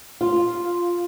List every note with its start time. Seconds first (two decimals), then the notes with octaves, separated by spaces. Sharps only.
0.21 F4